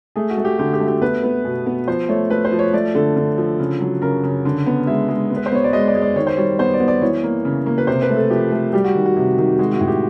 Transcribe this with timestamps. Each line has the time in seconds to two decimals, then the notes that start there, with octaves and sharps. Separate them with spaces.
0.16 A3 G#4
0.30 F#4
0.37 A3
0.45 G4
0.59 D3 G4
0.74 G4
0.80 A3
0.88 G4
1.01 B3 B4
1.23 B3
1.45 B2
1.66 B3
1.88 F3 C5
2.09 A3 C#5
2.30 A3 B4
2.45 C5
2.52 F3
2.59 C#5
2.73 A3 D5
2.95 D3 A4
3.16 D3
3.38 F3
3.59 C#3
3.80 F#3
4.02 C#3 A#4
4.24 C#3
4.45 D3
4.67 B3
4.87 G#3 E5
5.09 G#3
5.30 B3
5.36 B4
5.46 C5
5.52 B3 C#5
5.64 D5
5.73 G#3 D#5
5.88 D5
5.95 G#3
6.02 D5
6.16 D#3 C#5
6.27 C5
6.36 G3 C#5
6.59 B3 C5
6.73 D5
6.80 B3
6.88 D5
7.02 E3 C#5
7.24 A#3
7.45 C#3
7.66 A#3
7.78 B4
7.87 C3 C5
8.02 B4
8.09 A3
8.17 A4
8.30 F3 G4
8.52 A3
8.73 G3 G4
8.84 F#4
8.95 D#3
9.06 F#4
9.16 C3
9.38 D#3
9.59 G#3 F#4
9.74 F#4
9.81 A2
9.88 G4